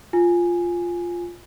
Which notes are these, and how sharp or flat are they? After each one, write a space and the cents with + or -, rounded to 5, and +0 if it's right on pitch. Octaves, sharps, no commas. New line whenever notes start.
F4 +0 G#5 +0